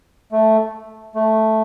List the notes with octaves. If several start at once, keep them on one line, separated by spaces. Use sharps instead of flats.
A3
A3